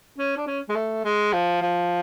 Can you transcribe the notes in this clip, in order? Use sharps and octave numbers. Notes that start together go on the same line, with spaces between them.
C#4
D4
C#4
G#3
A3
G#3
F3
F3